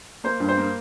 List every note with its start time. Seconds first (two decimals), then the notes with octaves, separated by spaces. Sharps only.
0.24 A#3 C5
0.40 G2
0.49 C5
0.58 A#3